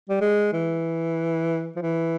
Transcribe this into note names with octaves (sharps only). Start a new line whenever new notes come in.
G3
G#3
E3
F3
E3